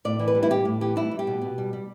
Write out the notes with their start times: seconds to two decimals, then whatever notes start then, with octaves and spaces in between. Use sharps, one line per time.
0.05 A2 D5
0.19 E3
0.28 B4
0.35 G3
0.43 E4
0.50 A2 G4
0.65 A2
0.81 E3 G4
0.96 G3 E4
1.12 G3
1.19 G4
1.27 B2
1.42 B2
1.58 G3
1.73 G3